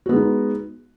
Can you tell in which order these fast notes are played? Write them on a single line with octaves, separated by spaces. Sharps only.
F#4 B3 G#3 D#4